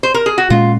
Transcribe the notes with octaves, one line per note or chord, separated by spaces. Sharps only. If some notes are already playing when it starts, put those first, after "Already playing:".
C5
A#4
G#4
F#4
A#2 G#3 C#4 F4